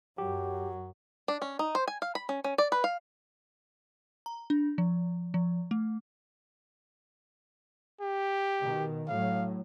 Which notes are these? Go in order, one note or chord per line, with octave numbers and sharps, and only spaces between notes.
F#2 F#3 G4
D4
C#4
D#4
C5
G#5
F5
B5
C#4
C#4
D5
B4
F5
A#5
D4
F3
F3
A3
G4
B2 D#3
A2 F#3 F5